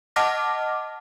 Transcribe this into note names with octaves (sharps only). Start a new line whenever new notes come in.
D#5 F#5 A5 D6 F6 A#6